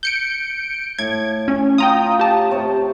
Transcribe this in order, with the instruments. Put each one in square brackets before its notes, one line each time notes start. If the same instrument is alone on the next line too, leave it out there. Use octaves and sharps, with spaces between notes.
[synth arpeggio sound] G6 C#7 D7
[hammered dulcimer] A2 [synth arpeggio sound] G#6
[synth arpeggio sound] C#4
[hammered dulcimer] F4 [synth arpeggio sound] G5 A#5 D#6
[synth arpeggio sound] G4 A5
[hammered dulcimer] C3 C#5 G5